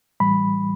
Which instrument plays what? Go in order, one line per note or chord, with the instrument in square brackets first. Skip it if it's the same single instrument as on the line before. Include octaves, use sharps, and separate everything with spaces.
[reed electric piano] A2 E3 G3 B5